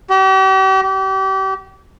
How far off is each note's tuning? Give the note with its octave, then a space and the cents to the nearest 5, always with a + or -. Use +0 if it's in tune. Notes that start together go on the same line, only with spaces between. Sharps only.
G4 -40
G4 -35